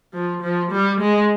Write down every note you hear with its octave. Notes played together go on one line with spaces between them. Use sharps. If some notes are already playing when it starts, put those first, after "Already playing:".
F3
F3
G3
G#3